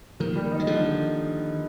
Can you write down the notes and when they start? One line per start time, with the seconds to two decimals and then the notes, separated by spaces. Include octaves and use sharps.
0.20 D#3 F3 A#3
0.36 G3
0.52 D#4
0.60 F#3
0.67 D3 D#3 F3